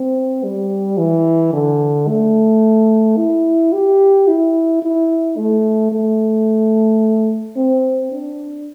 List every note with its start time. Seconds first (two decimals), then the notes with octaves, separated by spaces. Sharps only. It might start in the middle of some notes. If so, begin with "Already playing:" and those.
Already playing: C4
0.44 G3
0.98 E3
1.53 D3
2.08 A3
3.18 E4
3.73 G4
4.28 E4
4.82 E4
5.37 A3
5.92 A3
7.56 C4
8.12 D4